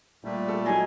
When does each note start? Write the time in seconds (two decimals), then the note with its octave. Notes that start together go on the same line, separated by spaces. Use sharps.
0.25 A#2 G3 A3
0.48 A4
0.66 F#3 D#4 G#5